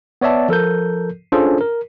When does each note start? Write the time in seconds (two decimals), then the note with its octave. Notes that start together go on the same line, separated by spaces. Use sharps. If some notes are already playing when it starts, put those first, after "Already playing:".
0.21 B3 C#5 D5 E5 A5
0.49 F3 A4 A#4 G6
1.32 C#4 D4 F4 G#4 A4 C5
1.61 A#4